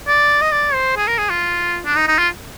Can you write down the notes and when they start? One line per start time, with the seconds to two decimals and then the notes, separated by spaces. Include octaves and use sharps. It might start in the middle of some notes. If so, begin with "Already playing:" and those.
0.07 D5
0.41 D#5
0.52 D5
0.74 C5
0.97 G#4
1.08 A#4
1.18 G#4
1.30 F4
1.85 D4
1.96 D#4
2.08 D#4
2.19 F4